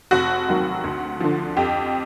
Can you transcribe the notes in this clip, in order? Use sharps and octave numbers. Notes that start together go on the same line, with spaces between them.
F1 F#4
D#2 D#3 F#3
D2
D3 F3
F2 G4